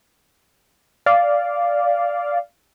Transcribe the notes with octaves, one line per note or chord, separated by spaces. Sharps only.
D5 F5